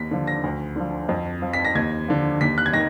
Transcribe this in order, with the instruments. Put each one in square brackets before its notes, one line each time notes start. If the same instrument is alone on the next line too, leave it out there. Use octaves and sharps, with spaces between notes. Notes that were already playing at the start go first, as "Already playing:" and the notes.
Already playing: [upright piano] D#2 B6
D3 F3
A#6
D2
D3 F3
F2
F3
B6
A#6
D#2 G#6
D3 F3
D#2 B6
F#6
G#6
D#3 A#6